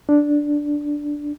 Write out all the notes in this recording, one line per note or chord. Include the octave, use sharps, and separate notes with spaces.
D4